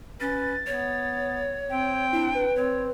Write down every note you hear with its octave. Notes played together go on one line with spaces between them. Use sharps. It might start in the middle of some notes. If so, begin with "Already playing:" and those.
C#4 B4 A6
B3 C#5
C4 G5
D4 E4
B4
C4 C#5